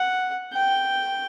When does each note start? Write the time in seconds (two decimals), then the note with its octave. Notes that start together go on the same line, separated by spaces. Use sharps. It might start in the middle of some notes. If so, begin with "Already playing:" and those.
Already playing: F#5
0.54 G5